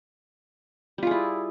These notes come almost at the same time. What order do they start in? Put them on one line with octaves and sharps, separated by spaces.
G3 F4 G#4 E4